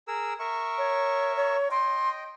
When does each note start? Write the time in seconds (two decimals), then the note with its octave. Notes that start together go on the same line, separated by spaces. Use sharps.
0.08 G#4 A#4 E6
0.40 A#4 E5 C#6
0.78 C#5
1.37 C#5
1.71 D#5 G5 C6